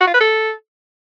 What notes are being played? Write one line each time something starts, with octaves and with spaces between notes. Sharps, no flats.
F#4
F4
B4
A4